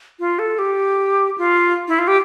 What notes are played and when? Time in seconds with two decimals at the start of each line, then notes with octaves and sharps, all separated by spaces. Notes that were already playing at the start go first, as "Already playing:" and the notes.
0.20 F4
0.39 A4
0.59 G4
1.38 F4
1.88 E4
1.99 F4
2.08 G4